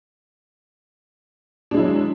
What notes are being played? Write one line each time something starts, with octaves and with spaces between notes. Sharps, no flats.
F#3 G#3 D4 E4